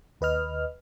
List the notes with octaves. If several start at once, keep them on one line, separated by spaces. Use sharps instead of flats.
D#2 B4 D#5 F6